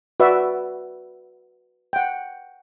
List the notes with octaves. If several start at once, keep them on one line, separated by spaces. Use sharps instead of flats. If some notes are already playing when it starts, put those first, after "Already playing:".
F#4 B4 D5 E5
F#5 G5